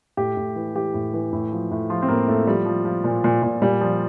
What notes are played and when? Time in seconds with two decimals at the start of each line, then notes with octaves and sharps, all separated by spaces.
0.17 A2 G4
0.37 A2
0.56 E3
0.75 E3 G4
0.94 A2
1.14 E3
1.33 A2
1.52 F3
1.71 A2
1.90 F3 F4
2.02 C4
2.08 A2 A#3
2.28 A2 A3
2.47 F3 G3
2.66 F3
2.85 F3
3.04 A#2
3.24 A#2
3.43 A#2
3.62 A#2 G3
3.81 F3